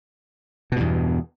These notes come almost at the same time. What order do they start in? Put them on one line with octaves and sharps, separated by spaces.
B2 G2 E2